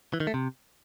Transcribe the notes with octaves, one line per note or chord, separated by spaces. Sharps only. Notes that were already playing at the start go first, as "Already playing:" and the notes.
E3
D#3
A3
C3